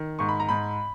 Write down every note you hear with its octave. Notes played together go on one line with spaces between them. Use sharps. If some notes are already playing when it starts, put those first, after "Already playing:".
Already playing: D#3
G#2 C#6
B5
A#5
G#2 B5